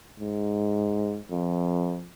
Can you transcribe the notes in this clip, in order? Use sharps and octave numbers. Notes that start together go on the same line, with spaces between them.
G#2
F2